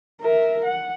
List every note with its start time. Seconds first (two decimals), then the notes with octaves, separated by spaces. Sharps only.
0.21 A#4 E5
0.65 F#5